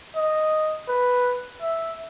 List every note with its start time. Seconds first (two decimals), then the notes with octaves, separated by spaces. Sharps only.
0.16 D#5
0.89 B4
1.62 E5